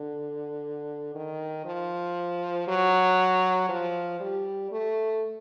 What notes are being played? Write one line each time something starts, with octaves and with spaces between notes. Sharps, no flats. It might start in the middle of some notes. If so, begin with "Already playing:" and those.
Already playing: D3
D#3
F3
F#3
F3
G3
A3